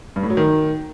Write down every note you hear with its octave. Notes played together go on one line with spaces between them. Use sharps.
G2
A2
F#3
D#3